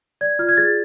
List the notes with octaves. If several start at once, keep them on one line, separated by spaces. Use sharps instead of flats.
D5 G#6
F4 F6
G#6
G#4 A6